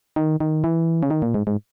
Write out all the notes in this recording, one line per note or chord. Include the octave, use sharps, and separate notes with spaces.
D#3
D#3
E3
C#3
D#3
A#2
G#2
G#2